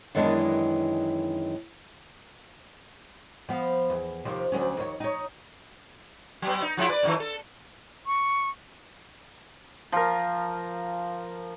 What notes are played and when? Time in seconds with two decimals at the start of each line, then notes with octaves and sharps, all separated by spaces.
0.15 F#2 D#3 E3 G#3 B3 D4
3.49 F3 B3
3.90 E2
4.25 D#2 C3 F3
4.52 D2 F#3 C#4
4.77 D#2 C#5
5.00 D#4 C#5
6.42 F#3 B3
6.62 D#4
6.77 F3 G#3 E4
6.89 B4 D5
7.03 F#2 A#2 D#3
7.20 A4
8.07 C#6
9.92 F3 A#4